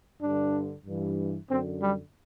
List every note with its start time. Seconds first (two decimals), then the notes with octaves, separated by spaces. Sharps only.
0.22 G2 D3 D4
0.86 G2 E3
1.50 F#2 D3 C4
1.82 G3